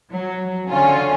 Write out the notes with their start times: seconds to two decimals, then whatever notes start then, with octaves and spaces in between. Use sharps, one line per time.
0.12 F#3
0.71 D3 C#4 F4